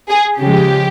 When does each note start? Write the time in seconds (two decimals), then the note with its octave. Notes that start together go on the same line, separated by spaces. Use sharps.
0.09 G#4
0.39 C#3 F3 G#3 G4